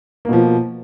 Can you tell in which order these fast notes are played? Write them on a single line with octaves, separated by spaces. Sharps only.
A#3 B2 F3